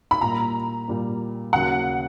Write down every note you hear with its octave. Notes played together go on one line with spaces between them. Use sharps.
B5
A#2 G3 A#3 A#5
A#2 G3 A#3
D#2 C#3 F#3 A#3 F#5